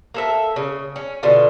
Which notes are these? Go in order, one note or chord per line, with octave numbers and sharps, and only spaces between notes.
A#3 A4 E5
C#3
C#4
B2 D3 F4